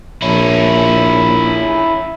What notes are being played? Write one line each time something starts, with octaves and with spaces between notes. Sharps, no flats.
A#1 C#4 E4